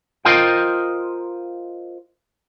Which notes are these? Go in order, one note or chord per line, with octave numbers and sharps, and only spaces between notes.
F4 A#4 C5 D#5 F5 G5